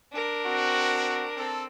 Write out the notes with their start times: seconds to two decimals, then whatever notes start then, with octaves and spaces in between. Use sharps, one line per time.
0.13 D4 A#4
0.45 C4 F#4
1.37 C4 A4